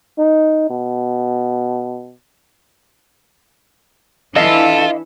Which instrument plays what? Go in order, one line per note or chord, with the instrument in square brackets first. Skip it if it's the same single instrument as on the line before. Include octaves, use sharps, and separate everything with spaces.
[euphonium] D#4
B2
[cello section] E3 D4 E4 [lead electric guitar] F4 [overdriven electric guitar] A4 [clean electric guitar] D#5 F5